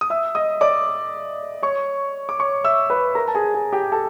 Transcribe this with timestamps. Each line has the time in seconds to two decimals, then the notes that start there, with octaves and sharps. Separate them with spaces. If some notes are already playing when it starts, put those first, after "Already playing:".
0.01 D#6
0.10 E5 E6
0.35 D#5 D#6
0.61 D5 D6
1.63 C#5 C#6
2.29 D6
2.40 C#5 C#6
2.64 E5 E6
2.90 B4 B5
3.15 A#4 A#5
3.28 A5
3.35 G#4 G#5
3.54 G#4 G#5
3.73 G4 G5
3.92 A4 A5